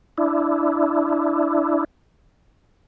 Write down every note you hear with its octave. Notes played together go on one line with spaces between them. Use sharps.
D4 E4